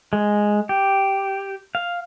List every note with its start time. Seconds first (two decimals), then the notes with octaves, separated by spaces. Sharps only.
0.13 G#3
0.69 G4
1.75 F5